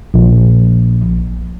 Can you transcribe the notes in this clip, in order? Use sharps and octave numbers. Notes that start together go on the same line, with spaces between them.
A#1